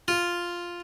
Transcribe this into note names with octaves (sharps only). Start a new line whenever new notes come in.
F4